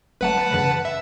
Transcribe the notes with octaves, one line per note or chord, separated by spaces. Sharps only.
G1 F#3 A3 B4 F#5 A5
F#2 C#3 E3
E5